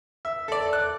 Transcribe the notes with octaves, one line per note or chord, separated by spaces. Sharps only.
E5
A4 D5
F#6